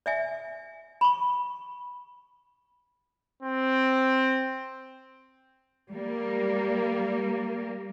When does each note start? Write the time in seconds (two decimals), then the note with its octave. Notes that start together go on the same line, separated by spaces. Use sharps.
0.06 D5 E5 G#5
1.01 B5 C#6
3.43 C4
5.91 G3 A#3